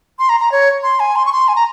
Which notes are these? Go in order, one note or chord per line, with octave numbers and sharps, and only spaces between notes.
C6
A#5
A#5
C#5
C6
G#5
C6
C#6
C6
G#5
A#5